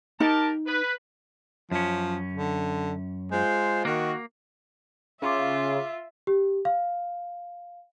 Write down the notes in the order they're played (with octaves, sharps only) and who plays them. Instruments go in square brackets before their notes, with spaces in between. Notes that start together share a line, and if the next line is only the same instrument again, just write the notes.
[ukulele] D#4 [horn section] G4 A#4 A5
[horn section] B4
[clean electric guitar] F#2 C#4 [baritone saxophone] F3
[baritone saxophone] D3
[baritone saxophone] G#3 [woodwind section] F4 C5
[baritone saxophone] D#3 [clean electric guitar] A#3 [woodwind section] F#4
[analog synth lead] C#3 [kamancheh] F4 [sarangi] E5 [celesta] F5 C6 D6
[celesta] G4
F5